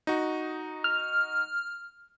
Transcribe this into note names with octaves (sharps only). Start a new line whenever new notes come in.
D#4 F#4
F6